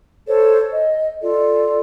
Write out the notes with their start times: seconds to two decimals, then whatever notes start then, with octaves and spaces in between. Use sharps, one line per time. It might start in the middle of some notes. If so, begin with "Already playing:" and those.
0.28 A4 C5 C#5
0.71 D#5
1.22 F4 A4 D5